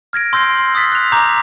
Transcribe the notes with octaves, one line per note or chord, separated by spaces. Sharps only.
F6 G#6 A#6 D7
C6 E6 G6 A#6 C7 D7
F#7
C6 D#6 E6 F#6 A6 B6
F#6 F7
A#5 D6 G6 A#6 B6